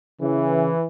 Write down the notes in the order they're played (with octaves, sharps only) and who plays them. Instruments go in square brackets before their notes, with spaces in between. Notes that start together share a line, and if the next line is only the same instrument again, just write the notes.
[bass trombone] C#3 [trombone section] E3